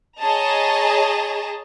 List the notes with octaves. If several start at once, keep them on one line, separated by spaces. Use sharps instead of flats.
G#4 C#5 D#5 A5 A#5